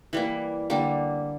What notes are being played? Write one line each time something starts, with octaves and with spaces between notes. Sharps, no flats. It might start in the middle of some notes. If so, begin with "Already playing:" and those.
E3 G3 A#3
D3 G3 A#3